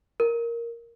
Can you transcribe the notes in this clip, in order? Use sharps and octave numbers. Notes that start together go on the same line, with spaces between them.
A#4